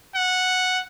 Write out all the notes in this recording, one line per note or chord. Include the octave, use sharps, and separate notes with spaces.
F#5